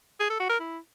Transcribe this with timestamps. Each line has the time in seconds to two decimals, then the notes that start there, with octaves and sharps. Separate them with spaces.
0.20 G#4
0.30 A4
0.40 F#4
0.49 A#4
0.59 E4